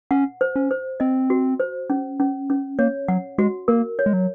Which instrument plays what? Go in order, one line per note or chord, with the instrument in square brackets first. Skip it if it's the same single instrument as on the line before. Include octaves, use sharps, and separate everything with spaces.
[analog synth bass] C#4 [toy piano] F#5
[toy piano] C5
[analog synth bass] C#4
[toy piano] C5
[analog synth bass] C4 [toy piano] D#5
[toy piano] F#4
C5
C#4
C#4
C#4
[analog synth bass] A#3 [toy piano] C#5
[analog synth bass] F#3 [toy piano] F#5
[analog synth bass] G#3 [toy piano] F#4
[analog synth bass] A#3 [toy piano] A#4
[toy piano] C#5
[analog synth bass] G#3
F#3